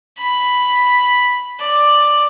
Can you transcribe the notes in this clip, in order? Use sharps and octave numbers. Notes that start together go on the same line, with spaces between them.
B5
D5